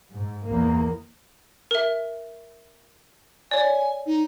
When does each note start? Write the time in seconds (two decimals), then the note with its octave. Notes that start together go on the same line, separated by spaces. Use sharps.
0.13 G#2
0.49 E2 A#3
1.71 A#4 E5
3.51 C#5 D5 G#5
4.06 D#4